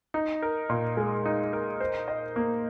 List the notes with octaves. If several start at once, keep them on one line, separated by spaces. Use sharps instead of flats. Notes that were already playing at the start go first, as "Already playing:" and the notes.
D#4
A#4
A#2
G#3
D#4
A#4
C5
D#5
A#3